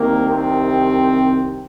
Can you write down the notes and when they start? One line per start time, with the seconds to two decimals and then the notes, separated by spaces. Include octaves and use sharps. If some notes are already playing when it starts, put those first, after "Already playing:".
Already playing: C2 C3 D#3 A#3
0.29 C4